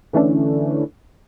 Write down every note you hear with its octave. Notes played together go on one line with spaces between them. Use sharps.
D3 E3 A3 C#4 D4